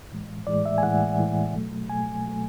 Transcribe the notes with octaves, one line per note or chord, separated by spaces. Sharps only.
A2 E3 G#3
A2 E3 G#3 D5
E5
G#5
A2 E3 G#3 F#5
A2 E3 G#3
B2 F#3 A3
B2 F#3 A3 G#5
B2 F#3 A3